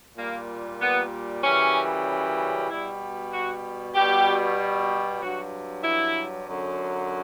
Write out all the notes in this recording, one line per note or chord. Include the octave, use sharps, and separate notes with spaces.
A#2 G3 A#3
B3
F#2 C#3 E3 G3 C#4
B2 G3 E4
F#4
B2 G3 G4
G2 F#3 F#4
E4
F#2 D3 F#3